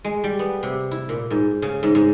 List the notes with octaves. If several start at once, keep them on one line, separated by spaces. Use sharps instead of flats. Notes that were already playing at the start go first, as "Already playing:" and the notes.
G#3
G3
B3
C3
E4
A#2
G#2
C#3
G#2
G#2